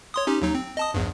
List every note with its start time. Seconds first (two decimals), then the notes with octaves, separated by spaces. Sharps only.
0.14 C#5 C6 D#6
0.27 C#4 D#4 G4
0.42 D#2 F#3 D#4
0.55 C4
0.77 D#5 A5 D#6
0.94 A#1 E2 G2